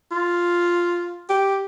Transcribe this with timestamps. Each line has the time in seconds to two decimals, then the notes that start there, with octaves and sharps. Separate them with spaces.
0.12 F4
1.30 G4